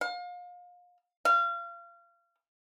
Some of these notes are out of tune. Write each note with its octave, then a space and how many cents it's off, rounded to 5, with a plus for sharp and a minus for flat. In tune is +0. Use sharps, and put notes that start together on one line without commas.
F5 +35
F5 -30